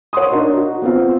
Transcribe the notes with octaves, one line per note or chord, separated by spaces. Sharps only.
C#5 F#5 C6 D#6
D4 D#4 F#4 A#4 D#5
F#4
B3 C4 F4